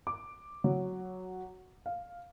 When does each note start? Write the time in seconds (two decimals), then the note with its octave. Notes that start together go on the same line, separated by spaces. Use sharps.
0.07 D6
0.64 F#3
1.86 F5